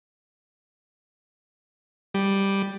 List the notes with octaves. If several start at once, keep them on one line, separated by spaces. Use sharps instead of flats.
G3